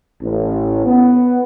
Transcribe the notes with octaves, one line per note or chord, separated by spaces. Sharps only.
A1
B3